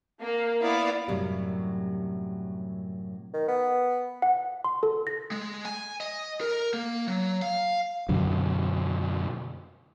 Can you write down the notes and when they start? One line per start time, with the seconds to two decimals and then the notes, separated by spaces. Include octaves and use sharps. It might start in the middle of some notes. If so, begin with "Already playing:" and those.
0.20 A#3
0.61 B3 E4 D5 F5
1.08 F#2 A2 C3 F#3 G3
3.34 D#3
3.48 B3
4.22 F#5
4.64 C6
4.83 A4
5.07 A#6
5.31 G#3
5.65 G#5
6.01 D#5
6.41 A#4
6.74 A#3
7.07 F#3
7.42 F5
8.09 F#2 B2 D3 F#3